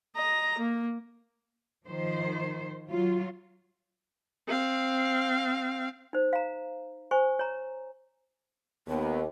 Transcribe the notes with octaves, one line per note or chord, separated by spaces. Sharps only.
D#5 A#5
A#3
D#3 F3 C5
F#3 F4
C4 F5
D#4 C5
F5 A#5
C5 G#5 C#6
C#5 A#5
D#2 B3